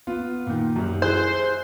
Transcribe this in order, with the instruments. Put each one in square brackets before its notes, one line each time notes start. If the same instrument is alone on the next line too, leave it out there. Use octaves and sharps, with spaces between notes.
[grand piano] B3 F4
A#2 D#3
F#2 G3
[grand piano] E4 G#4 F#6 [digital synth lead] C5